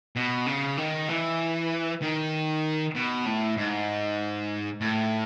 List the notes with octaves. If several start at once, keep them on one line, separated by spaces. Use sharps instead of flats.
B2
C#3
D#3
E3
D#3
B2
A2
G#2
A2